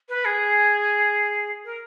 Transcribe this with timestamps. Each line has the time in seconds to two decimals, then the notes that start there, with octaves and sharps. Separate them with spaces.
0.09 B4
0.25 G#4
1.64 A#4